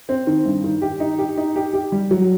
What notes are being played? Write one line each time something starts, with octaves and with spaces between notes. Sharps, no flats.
C4
D#3
G2
D#3
G4
D#4
G4
D#4
G4
G4
G3
F#3